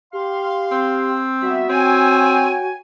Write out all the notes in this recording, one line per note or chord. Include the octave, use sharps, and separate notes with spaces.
G4 F5 C6
C4
G3 B3 F#4 E5
C4 C#5 G5 G#5